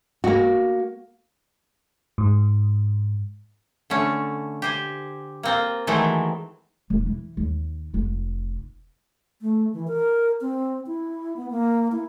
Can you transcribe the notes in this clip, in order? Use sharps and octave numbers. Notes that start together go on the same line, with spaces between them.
A#3 F#4
G#2
D3 A3 C#4
G4 C5 G#5
A#3 C4 F4
D#3 E3 F#3 G#3 A3 C4
E1 E3
E3
D#2
F1 F4
A3
E3
A#4
C4
E4
B3
A#3
E4